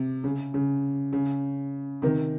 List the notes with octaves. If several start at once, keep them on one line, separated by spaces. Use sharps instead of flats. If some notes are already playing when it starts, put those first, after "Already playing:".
Already playing: C3
C#3
C#3
C#3
C3 D#3